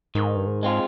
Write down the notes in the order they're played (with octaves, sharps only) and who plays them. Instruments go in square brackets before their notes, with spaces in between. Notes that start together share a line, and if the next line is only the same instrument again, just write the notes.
[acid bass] G#2 [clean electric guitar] D#3
[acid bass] G2
G#2
[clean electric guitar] G#3 C4 F4